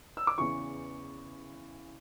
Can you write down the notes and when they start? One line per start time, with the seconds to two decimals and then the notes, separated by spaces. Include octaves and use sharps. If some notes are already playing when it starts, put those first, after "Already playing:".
0.17 E6
0.27 D6
0.38 E2 C#3 E3 C#6